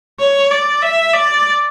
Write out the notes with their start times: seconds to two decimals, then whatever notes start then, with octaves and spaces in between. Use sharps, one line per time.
0.20 C#5
0.51 D5
0.82 E5
1.13 D5